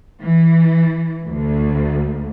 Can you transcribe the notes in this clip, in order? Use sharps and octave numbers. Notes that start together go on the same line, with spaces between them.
E3
D2